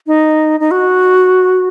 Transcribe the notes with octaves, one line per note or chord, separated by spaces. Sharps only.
D#4
D#4
F#4